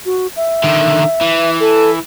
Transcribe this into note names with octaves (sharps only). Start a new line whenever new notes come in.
F#4
E5
D3 D#3
E3
A4